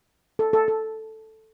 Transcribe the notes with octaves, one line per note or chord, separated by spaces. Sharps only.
A4
A4
A4